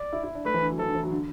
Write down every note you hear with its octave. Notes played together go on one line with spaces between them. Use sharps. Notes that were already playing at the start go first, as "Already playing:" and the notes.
Already playing: D5
E4
E4
D4
A3 B4
E3
D3
F#3
E3 A4
D3
E3
F#3
D3